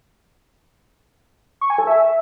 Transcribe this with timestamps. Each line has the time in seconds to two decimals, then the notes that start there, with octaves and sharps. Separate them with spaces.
1.61 C#6
1.70 G#5
1.78 A4
1.87 E5